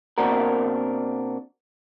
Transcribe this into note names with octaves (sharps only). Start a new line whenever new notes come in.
B2 A#3 C4 D4 F#4 A#4